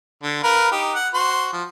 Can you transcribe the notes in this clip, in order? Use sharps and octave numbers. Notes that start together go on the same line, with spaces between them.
D3
A#4 B4 F5
D#4 G4
F#5
F#4 C5 C6
F3